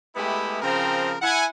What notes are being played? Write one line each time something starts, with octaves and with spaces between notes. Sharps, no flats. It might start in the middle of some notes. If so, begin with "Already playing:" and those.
G#3 A3 B3 E4 G4
C#3 F3 C4 A#4 G5 A#5
E4 F#5 G#5